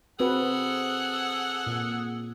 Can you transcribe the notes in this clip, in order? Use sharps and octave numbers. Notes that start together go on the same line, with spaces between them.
C4 F#4 G#4 A4 B4 F#5
A#2